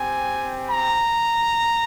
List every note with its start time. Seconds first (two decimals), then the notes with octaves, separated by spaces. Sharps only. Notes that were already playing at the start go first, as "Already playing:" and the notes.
Already playing: C4 G4 G#5
0.70 A#5